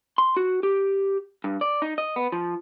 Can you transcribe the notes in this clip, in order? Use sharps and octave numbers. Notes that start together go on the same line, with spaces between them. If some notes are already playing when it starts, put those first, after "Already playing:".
C6
F#4
G4
G2
D5
D#4
D#5
B3
F3